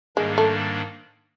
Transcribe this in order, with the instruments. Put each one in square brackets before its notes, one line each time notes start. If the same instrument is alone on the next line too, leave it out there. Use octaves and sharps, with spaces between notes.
[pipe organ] G#2 D#3 G3 A#3 D4 [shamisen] G#3
[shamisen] A3